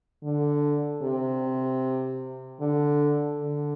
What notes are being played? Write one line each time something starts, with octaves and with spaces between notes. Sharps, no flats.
D3
C3
D3
D3